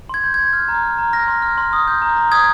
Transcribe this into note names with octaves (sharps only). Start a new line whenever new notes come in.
C6 G#6
G6
C6 G#6
F6
A#5
F6
A#5
F6 A#6
C6
F6
C6
D#6
G6
A#5
A#5
D#6 G#6